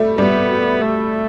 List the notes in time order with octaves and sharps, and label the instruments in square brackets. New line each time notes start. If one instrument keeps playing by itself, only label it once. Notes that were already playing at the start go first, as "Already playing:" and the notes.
Already playing: [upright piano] G3 A3
[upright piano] G3 [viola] B3
[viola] A3